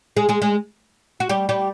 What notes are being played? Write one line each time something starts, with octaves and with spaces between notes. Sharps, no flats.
G#3 G#4
G#3 G#4
G#3 G#4
F#4
G3 G4
G3 G4